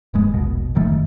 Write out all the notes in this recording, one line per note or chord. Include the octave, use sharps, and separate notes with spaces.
D#1 G2 G#3
E1 A#1 B2
F1 F#2 D#3 A3